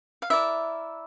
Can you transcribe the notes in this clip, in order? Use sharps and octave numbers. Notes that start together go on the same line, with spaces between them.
F5
E4 A#4 D5 E5